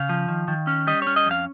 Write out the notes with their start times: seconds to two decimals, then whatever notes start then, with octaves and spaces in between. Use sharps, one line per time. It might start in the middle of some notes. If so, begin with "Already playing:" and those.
Already playing: C#3 F5
0.09 F3
0.28 D#3
0.48 D#3
0.67 C#4
0.87 G3 D#5
1.02 C#4 C#5
1.16 D#5
1.26 F2 F5